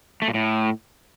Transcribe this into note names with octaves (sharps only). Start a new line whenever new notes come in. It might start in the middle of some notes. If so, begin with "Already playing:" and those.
A3
A#2
A2